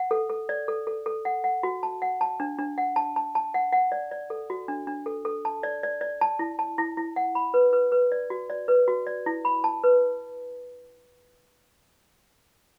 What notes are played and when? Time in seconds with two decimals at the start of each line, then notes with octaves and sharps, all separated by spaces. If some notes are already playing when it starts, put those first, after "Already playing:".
Already playing: F#5
0.11 A4
0.30 A4
0.49 D5
0.68 A4
0.87 A4
1.06 A4
1.25 F#5
1.44 F#5
1.63 F#4
1.83 A5
2.02 F#5
2.21 A5
2.40 D4
2.58 D4
2.78 F#5
2.96 A5
3.16 A5
3.35 A5
3.54 F#5
3.73 F#5
3.92 D5
4.11 D5
4.30 A4
4.50 F#4
4.68 D4
4.87 D4
5.06 A4
5.25 A4
5.45 A5
5.63 D5
5.83 D5
6.01 D5
6.21 A5
6.39 E4
6.59 A5
6.78 E4
6.97 E4
7.16 F#5
7.35 B5
7.54 B4
7.73 B4
7.92 B4
8.12 D5
8.30 F#4
8.50 D5
8.68 B4
8.88 F#4
9.07 D5
9.26 E4
9.45 B5
9.64 A5
9.84 B4